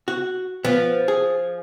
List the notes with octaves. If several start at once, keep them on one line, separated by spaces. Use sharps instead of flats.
F#4
F3 B3
G#4